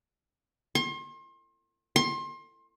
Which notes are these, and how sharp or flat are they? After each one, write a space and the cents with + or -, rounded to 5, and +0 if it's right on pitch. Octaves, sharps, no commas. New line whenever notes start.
C6 +35
C6 +30